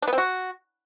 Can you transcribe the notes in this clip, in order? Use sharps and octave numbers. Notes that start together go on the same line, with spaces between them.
D4
B3
C4
F#4